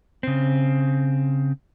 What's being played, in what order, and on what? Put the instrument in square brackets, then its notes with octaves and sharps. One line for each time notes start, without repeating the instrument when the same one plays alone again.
[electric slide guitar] C#3 C4